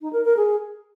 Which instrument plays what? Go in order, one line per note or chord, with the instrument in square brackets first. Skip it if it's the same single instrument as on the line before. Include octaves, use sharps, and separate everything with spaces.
[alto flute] D#4
A#4
A#4
G#4